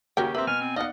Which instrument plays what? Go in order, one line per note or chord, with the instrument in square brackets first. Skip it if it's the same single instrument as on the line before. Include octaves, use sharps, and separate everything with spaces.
[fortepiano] D#2 C#3 C#4 [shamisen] F#4 A#4 G5 [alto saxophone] G4
[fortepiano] A#3 C4 [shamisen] B4 [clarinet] E5
[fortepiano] B2 [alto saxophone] G#5 [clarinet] F6
[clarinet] C4
[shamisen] B3 D#4 [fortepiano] D5 F#5 [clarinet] D#5 [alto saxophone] F5